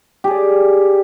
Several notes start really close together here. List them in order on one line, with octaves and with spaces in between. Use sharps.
G4 G#4 D5